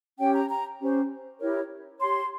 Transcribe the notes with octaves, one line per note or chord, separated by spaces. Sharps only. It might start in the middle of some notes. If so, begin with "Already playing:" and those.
C#4 G4 C#5 G5
A#5
A#5
C#4 G4 C5
E4 G4 A#4 C#5
G4 C#5 C6